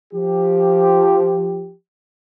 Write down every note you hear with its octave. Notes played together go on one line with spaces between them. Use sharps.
F3 G4